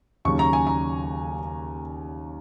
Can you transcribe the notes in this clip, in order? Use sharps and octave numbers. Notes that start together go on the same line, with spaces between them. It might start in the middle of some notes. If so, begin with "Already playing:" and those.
D#2 C#3 F#3 C#4 C#6
A#5
G#5
A#5